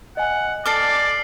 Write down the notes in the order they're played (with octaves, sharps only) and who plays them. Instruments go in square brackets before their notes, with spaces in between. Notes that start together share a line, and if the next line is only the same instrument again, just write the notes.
[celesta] D#5 G#5 [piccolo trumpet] F#5
[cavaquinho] A4 D6 [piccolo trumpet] D5 [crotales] F6 C7